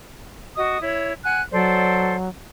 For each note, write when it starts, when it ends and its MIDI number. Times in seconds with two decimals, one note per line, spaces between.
0.57 0.80 66
0.57 0.80 75
0.57 0.80 87
0.81 1.14 64
0.81 1.14 73
1.24 1.41 78
1.24 1.41 80
1.24 1.41 90
1.52 2.29 54
1.52 2.16 69
1.52 2.16 72
1.52 2.16 74